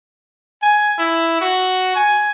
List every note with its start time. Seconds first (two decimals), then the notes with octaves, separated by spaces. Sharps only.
0.62 G#5
0.98 E4
1.41 F#4
1.95 G#5